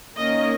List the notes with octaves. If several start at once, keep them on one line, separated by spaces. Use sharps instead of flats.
D#3 A#3 C#4 D#5